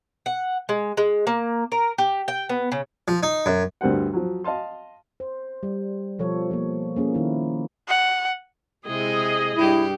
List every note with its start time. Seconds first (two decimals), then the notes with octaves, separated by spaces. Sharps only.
0.26 F#5
0.69 G#3
0.97 G#3
1.27 A#3
1.72 A#4
1.98 G4
2.28 G5
2.49 B3
2.72 C#3
3.08 F3
3.23 D#4
3.46 F#2
3.81 D2 G2 G3 A#4 C5 F#5
4.13 F3 F#3
4.44 D#5 F5 A5 C6
5.20 C5
5.63 G3
6.19 B2 F3 A4 C#5
6.51 F3 A#3
6.96 A#3 C#4 G#4
7.13 D#3 E4 G#4
7.88 F#5
8.86 C3 G#3 E4 G#4 D#5
9.57 G2 E4 G4